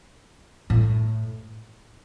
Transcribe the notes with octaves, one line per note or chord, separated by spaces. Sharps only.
A2